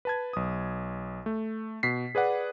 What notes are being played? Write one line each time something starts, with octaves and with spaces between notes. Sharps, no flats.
B4 A5 G#6
B1 D#6
A3
B2 B6 C7
G#4 B4 D5 F#5